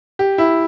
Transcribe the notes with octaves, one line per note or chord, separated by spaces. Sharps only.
G4
E4